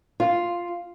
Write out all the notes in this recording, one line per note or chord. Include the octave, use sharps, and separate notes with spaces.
F4